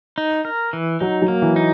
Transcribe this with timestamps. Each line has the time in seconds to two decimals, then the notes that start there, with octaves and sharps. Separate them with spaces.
0.18 D#4
0.45 A#4
0.73 E3
1.00 F#3 D#4
1.22 F#3
1.28 A#3
1.42 E3
1.56 D#4